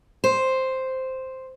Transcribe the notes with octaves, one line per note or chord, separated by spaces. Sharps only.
C5